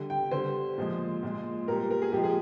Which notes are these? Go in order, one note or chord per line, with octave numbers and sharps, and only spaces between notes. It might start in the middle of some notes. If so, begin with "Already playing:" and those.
Already playing: D3 G3
G5
D3 G3 C5
A#2 F3 G#3
A#2 G#3
A#2 G3 A#4
A#4
G#4
A#2 F3 G#3 G4
G#4